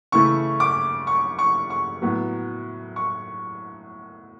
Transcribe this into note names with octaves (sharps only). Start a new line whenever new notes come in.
C#3 E3 A3 E4 C#6
D6
C#6
C#6
C#6
A2 F#3 B3
C#6